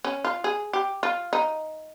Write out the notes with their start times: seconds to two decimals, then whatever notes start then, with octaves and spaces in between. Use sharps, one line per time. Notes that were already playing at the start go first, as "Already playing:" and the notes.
0.05 C#4
0.25 F4
0.44 G#4
0.73 G4
1.03 F4
1.33 D#4